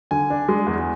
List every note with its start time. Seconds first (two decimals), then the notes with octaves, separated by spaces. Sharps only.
0.11 D3 G#5
0.30 D4
0.48 G#3
0.67 E2